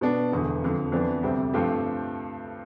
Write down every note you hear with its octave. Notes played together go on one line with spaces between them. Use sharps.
B2 B3 D4
E1 E2 D3
F2 D3 F3
F2 E3 B3 D4
D2 C3 G3 C4
G2 F3 A3 C4 G4